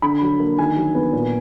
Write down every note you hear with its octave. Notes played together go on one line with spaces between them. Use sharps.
D3 B5
F#3
A#3
D#3 G#5
F#3
B3
A#2